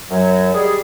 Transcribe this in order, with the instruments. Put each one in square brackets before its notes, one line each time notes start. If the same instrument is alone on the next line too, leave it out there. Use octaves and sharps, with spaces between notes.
[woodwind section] F#2 F#3
G3 G#3 G#4